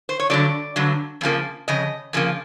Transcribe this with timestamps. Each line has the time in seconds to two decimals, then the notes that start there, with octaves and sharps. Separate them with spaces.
0.09 C5
0.19 C#5
0.30 G2 D3 F#3 D5
0.76 G2 D3 F#3
1.21 F2 C#3 F3 A#3
1.68 F2 C#3 D#5
2.13 F2 C#3 F3 A#3